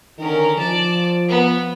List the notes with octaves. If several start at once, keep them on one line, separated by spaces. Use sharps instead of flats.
D3 D#3 C#4 A#4
F3 D5 A5
B3